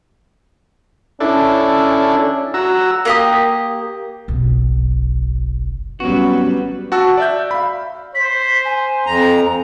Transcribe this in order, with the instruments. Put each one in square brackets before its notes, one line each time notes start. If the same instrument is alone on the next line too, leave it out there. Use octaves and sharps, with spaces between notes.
[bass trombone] C#4 [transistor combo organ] D4 E4 A4
[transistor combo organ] F#4 A#5 E6
[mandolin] A#3 G4 D#6
[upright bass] F#1 B1
[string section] G#1 G3 B4 [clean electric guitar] F#3 F#4 [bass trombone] B3 [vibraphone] C#4
[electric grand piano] F#4 F#5 A5 E6
D5 E5 G6
F5 B5
[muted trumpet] C5 [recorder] B6
[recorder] G#5
[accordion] F2 A#5